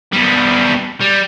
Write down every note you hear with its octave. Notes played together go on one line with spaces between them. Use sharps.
B2 G3
G3